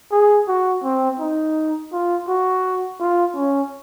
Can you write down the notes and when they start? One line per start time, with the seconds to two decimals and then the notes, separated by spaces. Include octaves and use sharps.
0.12 G#4
0.48 F#4
0.84 C4
1.20 D#4
1.92 F4
2.28 F#4
3.00 F4
3.36 C#4